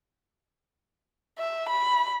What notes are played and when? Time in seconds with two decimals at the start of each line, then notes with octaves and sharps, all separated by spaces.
1.39 E5
1.69 B5